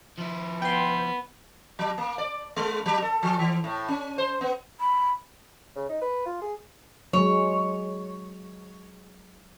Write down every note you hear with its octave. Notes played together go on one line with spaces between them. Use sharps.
F3 E4
B3 G5 C6
F#3
A#3
D5
G#3
F#3
A4
F3
E3
A2
C#4
C5
B3
B5
C#3
D#4
B4
F4
G#4
F#3 G#3 C#5